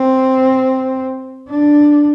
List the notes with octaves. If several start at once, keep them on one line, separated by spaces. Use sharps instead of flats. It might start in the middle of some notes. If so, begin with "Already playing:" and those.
Already playing: C4
D4